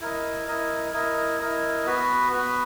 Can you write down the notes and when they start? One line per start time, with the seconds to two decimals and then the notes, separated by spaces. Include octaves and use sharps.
0.01 E4 A#4 D#5
0.48 E4 A#4 D#5
0.93 E4 A#4 D#5
1.40 E4 A#4 D#5
1.86 B3 F#4 B4
2.32 B3 F#4 B4